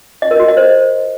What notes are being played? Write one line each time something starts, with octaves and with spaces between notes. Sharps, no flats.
D#5
A#4
F#4
D#5
C5